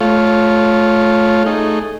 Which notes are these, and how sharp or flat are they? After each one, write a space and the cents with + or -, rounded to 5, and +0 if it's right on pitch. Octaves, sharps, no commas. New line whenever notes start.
A3 -15 F4 +0 C#5 +0
A3 +0 D#4 -10 G#4 +0